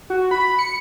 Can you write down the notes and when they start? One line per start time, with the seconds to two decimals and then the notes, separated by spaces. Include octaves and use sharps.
0.10 F#4
0.31 B5
0.59 C#7